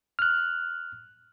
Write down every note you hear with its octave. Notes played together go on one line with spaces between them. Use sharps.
F6 F#6